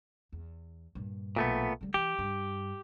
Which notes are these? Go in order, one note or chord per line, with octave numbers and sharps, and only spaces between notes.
E2
G2 A#2
B1 A#2 A3 B3
D3 G3
E3 G4
G2